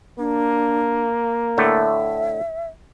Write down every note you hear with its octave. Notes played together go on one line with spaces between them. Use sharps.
A#3 D4
A2 D3 A3 E5